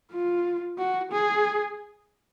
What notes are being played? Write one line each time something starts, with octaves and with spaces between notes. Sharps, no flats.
F4
F#4
G#4